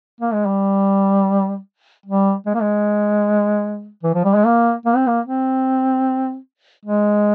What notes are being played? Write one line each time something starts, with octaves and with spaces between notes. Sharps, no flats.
A#3
G#3
G3
G3
G#3
A#3
G#3
E3
F3
G3
G#3
A#3
A#3
C4
A#3
C4
G#3